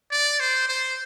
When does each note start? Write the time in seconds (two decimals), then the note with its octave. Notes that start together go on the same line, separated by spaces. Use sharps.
0.11 D5
0.40 C5
0.68 C5